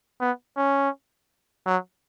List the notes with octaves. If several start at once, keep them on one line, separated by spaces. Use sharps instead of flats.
B3
C#4
F#3